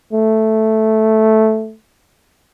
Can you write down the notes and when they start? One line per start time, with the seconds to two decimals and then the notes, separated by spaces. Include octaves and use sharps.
0.13 A3